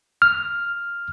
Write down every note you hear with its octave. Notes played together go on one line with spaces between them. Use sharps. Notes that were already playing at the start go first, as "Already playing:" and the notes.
F6